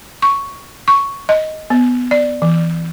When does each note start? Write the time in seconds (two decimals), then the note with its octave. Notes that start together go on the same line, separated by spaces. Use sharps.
0.22 C#6
0.88 C#6
1.29 D#5
1.70 B3
2.11 D5
2.42 E3